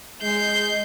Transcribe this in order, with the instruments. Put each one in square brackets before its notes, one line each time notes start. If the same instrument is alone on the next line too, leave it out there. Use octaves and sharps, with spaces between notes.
[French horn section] G#3 [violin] G6 C7